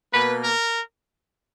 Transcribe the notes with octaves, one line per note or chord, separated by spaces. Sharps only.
B2 A#3 B4
A#4